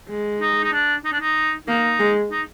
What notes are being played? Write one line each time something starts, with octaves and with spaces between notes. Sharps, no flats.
G#3
D#4
D#4
D4
D#4
D4
D#4
A#3 D#4
G#3
D#4